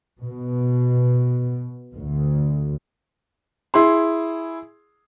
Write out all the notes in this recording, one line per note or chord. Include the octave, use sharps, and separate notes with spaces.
B2
D2
E4 G#4 C6